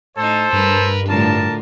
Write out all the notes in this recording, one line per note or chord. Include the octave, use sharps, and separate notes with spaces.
A2 D#4 A4 C5
G2 A#4 B4
A2 D3 F4 A#4 A5